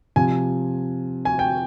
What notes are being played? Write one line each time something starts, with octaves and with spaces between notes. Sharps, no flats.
C3 F3 G#5
G#5
G5